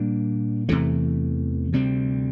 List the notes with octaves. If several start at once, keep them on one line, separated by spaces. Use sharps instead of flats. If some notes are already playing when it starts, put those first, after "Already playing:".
Already playing: A#2 G3 A#3 D4
E2 C3 E3 A3
D2 C3 G3 C4